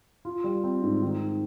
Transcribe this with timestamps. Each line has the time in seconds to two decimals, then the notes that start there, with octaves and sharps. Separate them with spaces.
0.25 F4
0.44 G3
0.64 C4
0.82 G#2
1.02 D#3